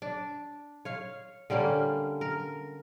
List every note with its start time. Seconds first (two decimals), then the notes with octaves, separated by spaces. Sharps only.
0.02 D4
0.85 C#5 F5
1.50 D3 G3 A#3 C#4
2.21 A#4